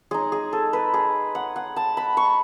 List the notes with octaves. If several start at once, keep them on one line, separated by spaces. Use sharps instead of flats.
G#3 D#4 G#4
G#4
A4
B4
G#4
F#5
F#5
A5
B5
C#6